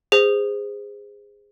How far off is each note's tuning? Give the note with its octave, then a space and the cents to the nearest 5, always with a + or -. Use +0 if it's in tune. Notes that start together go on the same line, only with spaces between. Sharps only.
G#4 -25 C5 -15